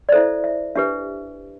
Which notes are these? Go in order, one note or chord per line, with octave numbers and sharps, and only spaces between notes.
D5
E4 A4 C5 E5
E5
D4 G4 B4 E5